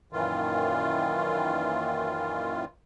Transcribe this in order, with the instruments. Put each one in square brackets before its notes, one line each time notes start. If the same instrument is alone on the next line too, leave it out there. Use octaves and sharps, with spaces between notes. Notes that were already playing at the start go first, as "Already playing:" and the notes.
[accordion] F#2 A#2 D#3 E3 F4